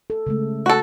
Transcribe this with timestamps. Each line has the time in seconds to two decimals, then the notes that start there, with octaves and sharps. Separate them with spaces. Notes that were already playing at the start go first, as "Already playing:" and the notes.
0.10 A4
0.27 C#3 G#3 A3
0.66 F#4 A4